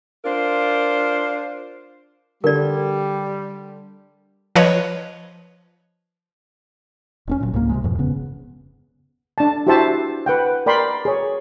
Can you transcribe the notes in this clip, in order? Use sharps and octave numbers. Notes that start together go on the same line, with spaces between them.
D4 F4 A#4 C5
D3 G3 A#4 D5
F3 B4 C#5 D#5
E1 C4 C#4
A#2 E3 F#3
C2 G#2 A#3
C3 F3 G#3
F2 G#2 B2 F3
E1 C#3 B3
D4 A5
E4 F#4 G4 C5 E5 A5
B4 F#5 G5
A#4 D5 G5 B5 C6
G#4 C#5